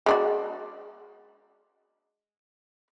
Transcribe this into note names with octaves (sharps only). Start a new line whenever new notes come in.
G#3 D4 F#4